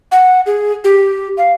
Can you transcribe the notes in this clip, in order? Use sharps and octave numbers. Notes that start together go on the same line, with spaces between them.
F#5
G#4
G4
F5